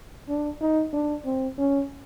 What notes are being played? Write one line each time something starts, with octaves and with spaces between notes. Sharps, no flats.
D4
D#4
D4
C4
C#4